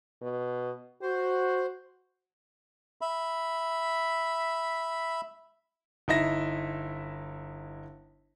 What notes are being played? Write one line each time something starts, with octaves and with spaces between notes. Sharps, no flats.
B2
F#4 C5
E5 B5
G1 D#4 E4 E5 A#6